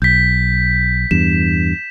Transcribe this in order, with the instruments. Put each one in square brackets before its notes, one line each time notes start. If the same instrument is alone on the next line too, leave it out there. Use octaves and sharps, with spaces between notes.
[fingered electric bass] B1 [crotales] G6 B6
[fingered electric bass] E2 G2 [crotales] E7